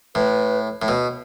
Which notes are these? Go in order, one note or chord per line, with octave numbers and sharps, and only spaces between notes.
A2 B4
A2
B2